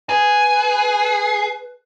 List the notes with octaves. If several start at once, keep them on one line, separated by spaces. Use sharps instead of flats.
G#4 B4